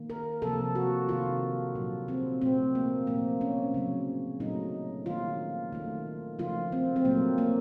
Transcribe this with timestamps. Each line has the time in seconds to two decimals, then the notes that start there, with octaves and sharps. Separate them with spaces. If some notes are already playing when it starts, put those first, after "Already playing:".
Already playing: D#3 A#3
0.10 A#4
0.42 C3 F3 A#3 A4
0.75 F#4
1.09 C3 D#3 A#3 F4
1.75 A#2 F#3 A#3
2.08 C4
2.41 A#2 A3 C4
2.75 A#3
3.07 A#2 F3 A3 A#3
3.41 C#4
3.74 C#3 F#3 A#3
4.40 A#2 F#3 A3 D#4
5.06 D#3 A#3 F4
5.72 D#3 A3
6.39 C#3 F3 A3 F4
6.72 C4
6.96 C4
7.05 A#2 F#3 A3 A#3
7.38 A#3